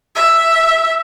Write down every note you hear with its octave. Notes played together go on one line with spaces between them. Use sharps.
E5